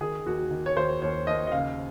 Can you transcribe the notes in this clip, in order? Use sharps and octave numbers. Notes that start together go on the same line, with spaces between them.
D#3 G#4
D#2 F#4
D#3
C#5
D#2 C5
D#2 C#5
D#2 D#5
D#5
C#3 F5